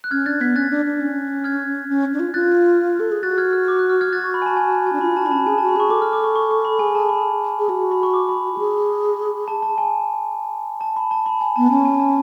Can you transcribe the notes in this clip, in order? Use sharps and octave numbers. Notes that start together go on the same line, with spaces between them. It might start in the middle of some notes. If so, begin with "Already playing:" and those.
F#6
C#4 F6 G#6
D4 F#6 A6
B3 G#6 B6
C#4 F#6 A6
D4
D4
C#4
F6 G#6
C#4
D4
F4
F4 F#6 A6
A4
G#4
F#4 F#6 A6
F6 G#6
F6
D6
F#6
F6
F6 G#6
F#4 F#6 A6
C#6
B5
G#5
A5
G#5
G#5
D4
F4 B5
F#4 A5
D4 B5
C#4 A5
G#4 G#5
A5
F#4
B5
G#4 C#6
A4 D6
F6
D6
C#6
C#6
C#6
B5
G#4 G#5
A5
B5
G#4
F#4
B5
C#6
D6
B5
F#4
G#4
A5
A5
G#5
A5
B5
A5
B5
G#5
B3 A5
C#4 G#5
G#5
A5